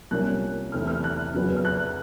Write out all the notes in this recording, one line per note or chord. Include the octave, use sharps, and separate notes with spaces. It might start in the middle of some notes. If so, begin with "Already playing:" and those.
C2 C3 F3 A#3 C#4 F#6
E2 C3 E3 A3 C4 F6
F6
F#6
F2 C#3 F#3 B3
F6
F#6